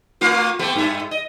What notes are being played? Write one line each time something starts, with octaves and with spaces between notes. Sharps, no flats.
A3 F4 A#4
A3 B3 G4
G2 E5
D#5